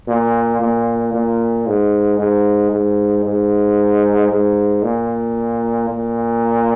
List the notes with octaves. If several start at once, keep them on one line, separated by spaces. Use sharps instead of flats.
A#2
A#2
A#2
G#2
G#2
G#2
G#2
G#2
A#2
A#2